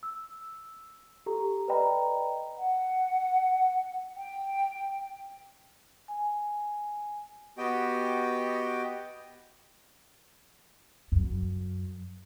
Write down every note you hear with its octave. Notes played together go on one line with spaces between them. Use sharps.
E6
G4 A4 A#5
B4 D5 D#5 G5 A#5 B5
F#5
G5
G#5
B3 F#4 G4 D#5 G5
F#2